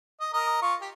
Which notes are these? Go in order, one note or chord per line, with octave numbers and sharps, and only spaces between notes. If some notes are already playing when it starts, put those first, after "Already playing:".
D#5
A#4 D#5
F4 C#6
G4